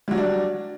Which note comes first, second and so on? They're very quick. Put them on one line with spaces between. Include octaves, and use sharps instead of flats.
G3 F#3 F#4 D4